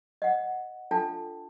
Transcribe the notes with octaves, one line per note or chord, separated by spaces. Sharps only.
D#5 F#5
D4 F4 A4 G5 A5